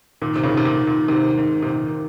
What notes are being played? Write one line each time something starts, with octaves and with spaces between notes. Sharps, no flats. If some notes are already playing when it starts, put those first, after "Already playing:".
A#2 D#3
C3
A#2 C#3
D#3
C3
A#2
D#3
A#2
G#2 C3 D#3
G#2 D#3
C3
A#2 D#3